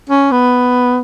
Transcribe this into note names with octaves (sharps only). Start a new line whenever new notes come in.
C#4
B3